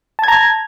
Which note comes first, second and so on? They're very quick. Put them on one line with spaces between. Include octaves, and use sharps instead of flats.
A5 G#6 A#5